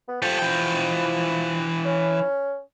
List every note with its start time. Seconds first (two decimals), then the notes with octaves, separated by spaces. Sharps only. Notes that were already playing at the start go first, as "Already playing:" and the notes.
0.08 B3
0.22 F3 G4 A4
0.38 E3 G5
1.85 C#4